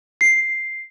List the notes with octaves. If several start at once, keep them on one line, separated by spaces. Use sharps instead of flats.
C7